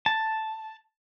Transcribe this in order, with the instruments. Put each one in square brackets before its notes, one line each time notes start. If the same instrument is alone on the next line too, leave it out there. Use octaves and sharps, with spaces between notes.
[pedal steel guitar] A5